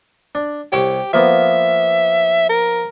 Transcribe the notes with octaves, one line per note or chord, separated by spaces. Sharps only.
D4
C2 G4 C#5
F3 A#3 B3 E5
A#4